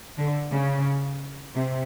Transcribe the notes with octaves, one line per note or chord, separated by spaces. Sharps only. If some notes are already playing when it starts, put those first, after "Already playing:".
D3
C#3
C3